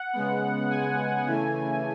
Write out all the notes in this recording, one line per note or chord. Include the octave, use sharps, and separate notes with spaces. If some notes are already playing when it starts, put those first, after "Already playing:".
Already playing: F#5
C#3 G#3 B3
G#5
C#3 E3 A3